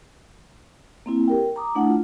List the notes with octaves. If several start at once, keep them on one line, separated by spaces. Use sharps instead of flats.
A#3 C4 E4
G4 A#4 G5
A#5 D6 D#6
A3 D4 E4 F#5
F4